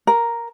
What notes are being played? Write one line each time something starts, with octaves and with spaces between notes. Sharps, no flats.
A#4